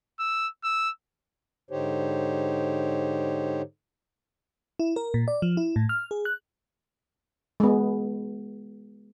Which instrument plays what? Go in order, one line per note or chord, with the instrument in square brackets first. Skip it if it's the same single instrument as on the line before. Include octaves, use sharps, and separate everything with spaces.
[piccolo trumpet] E6
E6
[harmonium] G#2 D3 D#4 G4 C5 C#5
[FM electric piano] E4
A#4
A#2
D5
F3
E4
A2
F6
G#4
F#6
[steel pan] G#3 B3